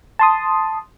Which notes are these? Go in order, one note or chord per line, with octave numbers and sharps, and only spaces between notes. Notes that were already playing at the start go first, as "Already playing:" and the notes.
A5 C6 D#6